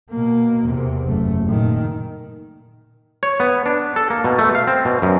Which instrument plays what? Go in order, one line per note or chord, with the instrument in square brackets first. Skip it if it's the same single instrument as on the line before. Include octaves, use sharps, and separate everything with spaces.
[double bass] B2 A#3
E2 C3
F#1 A3
A#2 D#3
[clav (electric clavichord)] C#5
B3
D4
A4
A#3
B2
A3
F5
C4
B2
F#2